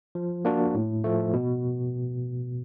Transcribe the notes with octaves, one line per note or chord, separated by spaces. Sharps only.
F3
A#3 D4 F#4
A2
F3 A3
B2